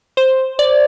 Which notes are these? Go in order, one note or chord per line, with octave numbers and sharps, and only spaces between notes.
C5
D5